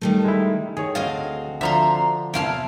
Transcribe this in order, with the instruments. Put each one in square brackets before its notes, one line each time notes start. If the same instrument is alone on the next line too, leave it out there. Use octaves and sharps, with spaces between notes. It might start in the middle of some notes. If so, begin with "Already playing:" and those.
[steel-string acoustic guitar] D#3 G3 A3
[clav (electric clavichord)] G#3 E4
[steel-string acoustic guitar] D#3 [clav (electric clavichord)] G#4 C#5
[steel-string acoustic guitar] D2 C4 F#4 [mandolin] D#5 F5
[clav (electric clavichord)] D3 F3 [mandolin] E5 A#5 C6
[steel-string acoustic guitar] E2 C3 A5 [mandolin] E4 F5 F6